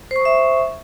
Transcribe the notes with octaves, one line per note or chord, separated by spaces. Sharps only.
C5 E5 C#6 D#6